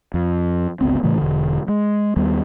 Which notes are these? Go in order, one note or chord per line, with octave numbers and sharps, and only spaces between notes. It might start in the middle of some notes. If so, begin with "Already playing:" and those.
F2
G1 C#2 B3 C4
A2 C#3 E3 A3
E1 D3
G#3
D#2 G3 B3